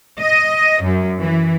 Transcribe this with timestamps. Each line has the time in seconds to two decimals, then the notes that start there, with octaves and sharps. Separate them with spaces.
0.20 D#5
0.82 F#2
1.20 E3